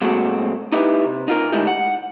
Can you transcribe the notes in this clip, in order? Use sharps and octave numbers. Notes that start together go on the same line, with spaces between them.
A#2 F#3 G#3 A3 C4 F#4
D#4 E4 G4 B4
C3
D#4 F4 A#4
D3 G#3 A3 D#4 E4 G4
F#5